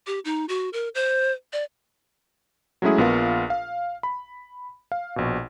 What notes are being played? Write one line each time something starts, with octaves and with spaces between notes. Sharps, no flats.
G4
D#4
F#4
A#4
C5
D5
F#3 G#3 A3 C#4 E4 G#4
A#1 B3 F4 A#4 F5
F5
B5
F5
A#1 B2